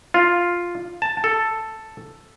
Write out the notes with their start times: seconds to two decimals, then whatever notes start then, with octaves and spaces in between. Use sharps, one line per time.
0.14 F4
1.02 A5
1.24 A4